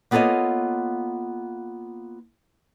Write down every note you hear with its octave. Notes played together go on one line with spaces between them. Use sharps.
A#3 B3 F4 A4 C#5 D#5